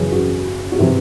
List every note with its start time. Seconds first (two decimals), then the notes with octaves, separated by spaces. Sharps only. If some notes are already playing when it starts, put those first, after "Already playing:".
Already playing: F#2 C#3 E3 G#4
0.12 F#4
0.72 F#4
0.79 C3 E3 E4